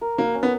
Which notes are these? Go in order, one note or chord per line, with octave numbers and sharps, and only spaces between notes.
A#4
A#3 F#4
C#4
B3